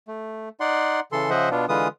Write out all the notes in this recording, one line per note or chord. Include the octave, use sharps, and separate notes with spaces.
A3
D#4 D5 F#5 C6
C#3 E3 A4 C6
C#3 F3 C5 D#5 E5 F#5
B2 B3 D4 F4
D3 E3 G#3 F4 B4 D#6